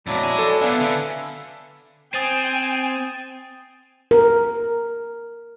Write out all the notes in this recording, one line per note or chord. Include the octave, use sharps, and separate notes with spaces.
F2 A#2 F#3 D4 E4
D#5 G#5
A4 D5
B3 D4 B4 E5 F5 G#5
D3
C4 G5 G#5 D#6 A6 D#7
A#4